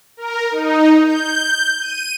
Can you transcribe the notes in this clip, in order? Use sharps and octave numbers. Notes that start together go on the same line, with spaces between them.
A#4
D#4
G6
D#7